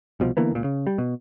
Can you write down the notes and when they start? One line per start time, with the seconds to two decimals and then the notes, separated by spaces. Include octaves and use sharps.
0.20 C2 B2 F3
0.37 D3 E3 A#3 B3
0.51 C#2 A#2
0.64 C#3
0.87 G3
0.98 B2